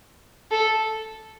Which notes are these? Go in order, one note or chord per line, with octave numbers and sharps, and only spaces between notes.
A4